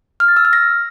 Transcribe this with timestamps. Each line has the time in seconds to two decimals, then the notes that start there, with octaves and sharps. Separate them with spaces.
0.20 F6
0.28 A6
0.37 E6
0.45 F6
0.53 A#6